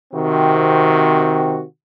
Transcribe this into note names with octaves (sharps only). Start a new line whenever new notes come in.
C3 D#3 C4 F#4